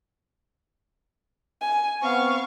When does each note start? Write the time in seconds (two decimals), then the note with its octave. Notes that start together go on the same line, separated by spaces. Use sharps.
1.61 G#5
2.03 B3 C4 F5 C#6